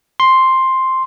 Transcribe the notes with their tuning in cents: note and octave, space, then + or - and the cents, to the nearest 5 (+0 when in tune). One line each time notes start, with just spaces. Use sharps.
C6 +5